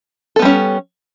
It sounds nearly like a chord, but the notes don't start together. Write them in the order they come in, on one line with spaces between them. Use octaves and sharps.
A4 B3 G3 C#4